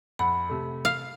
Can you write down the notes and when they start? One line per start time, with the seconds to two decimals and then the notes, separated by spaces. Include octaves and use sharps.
0.19 F2 F#5 B5 C#7
0.49 C3 A3
0.85 F5